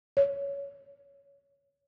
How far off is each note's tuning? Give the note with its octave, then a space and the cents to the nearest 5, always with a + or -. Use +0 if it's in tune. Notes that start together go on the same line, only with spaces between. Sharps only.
C#5 +15